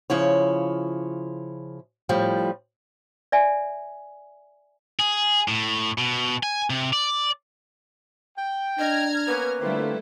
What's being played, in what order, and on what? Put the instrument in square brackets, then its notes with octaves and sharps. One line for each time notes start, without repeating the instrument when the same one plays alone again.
[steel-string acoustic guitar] C#3 F3 E4 C#5
A2 F3 G3
[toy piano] D5 E5 G#5
[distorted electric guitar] G#4
A2
B2
G#5
C3
D5
[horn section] G5
[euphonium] D4 [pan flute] D#5 [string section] A#5 F6 G#6
[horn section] A#3 B3 C#4 [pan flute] B4
[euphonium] D3 [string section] G3 A3 E4 [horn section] A#3 C4 F4